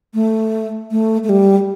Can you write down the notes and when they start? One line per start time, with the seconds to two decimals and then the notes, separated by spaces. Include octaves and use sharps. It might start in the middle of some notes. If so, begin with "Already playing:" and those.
0.14 A3
0.91 A3
1.24 A3
1.29 G3